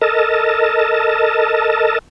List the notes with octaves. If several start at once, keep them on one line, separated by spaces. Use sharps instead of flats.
A4 A#4 D#5 A5